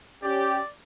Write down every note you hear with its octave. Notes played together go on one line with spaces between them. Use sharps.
C#4 G4 D5